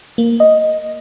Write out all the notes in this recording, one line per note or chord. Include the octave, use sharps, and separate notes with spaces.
A#3
D#5